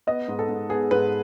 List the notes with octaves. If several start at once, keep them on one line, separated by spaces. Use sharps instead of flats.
B3 D#5
G#2
A4
G#2
B3 G#4
G#2 B4